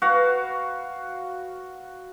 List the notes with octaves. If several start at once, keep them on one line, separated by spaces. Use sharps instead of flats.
F#4 B4 F5